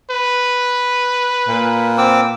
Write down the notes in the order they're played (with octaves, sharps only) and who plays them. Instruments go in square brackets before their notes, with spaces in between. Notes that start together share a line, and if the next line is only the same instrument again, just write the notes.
[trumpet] B4
[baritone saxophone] A#2
[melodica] C4 D6 E6